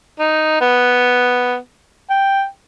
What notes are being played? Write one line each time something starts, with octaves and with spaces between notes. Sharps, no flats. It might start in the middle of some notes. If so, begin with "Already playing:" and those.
D#4
B3
G5